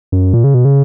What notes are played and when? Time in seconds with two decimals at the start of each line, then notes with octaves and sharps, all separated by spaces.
0.12 F#2
0.34 A#2
0.44 C#3
0.54 B2
0.65 C#3